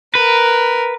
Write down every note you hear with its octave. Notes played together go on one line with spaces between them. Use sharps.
A#4 B4